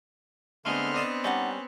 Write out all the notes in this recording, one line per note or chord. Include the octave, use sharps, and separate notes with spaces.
D3 G#3 A3 B3 C4 C6 F6
D4 D#5 A5
G3 C#4 D#4 D5 F#5